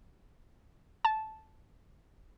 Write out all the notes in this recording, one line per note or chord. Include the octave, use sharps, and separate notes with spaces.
A5